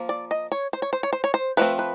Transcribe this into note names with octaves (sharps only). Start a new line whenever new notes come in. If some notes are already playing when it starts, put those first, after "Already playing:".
Already playing: F3 A#3
D5
D#5
C#5
C5
C#5
C5
C#5
C5
C#5
C5
F3 A3 C4 B4
B4